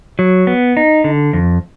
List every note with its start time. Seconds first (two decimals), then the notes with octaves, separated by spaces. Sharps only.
0.19 F#3
0.47 B3
0.77 D#4
1.04 D3
1.33 F2